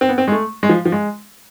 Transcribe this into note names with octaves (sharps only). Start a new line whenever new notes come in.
C4
B3
C4
G#3
A3
G#3
F3
F3
G#3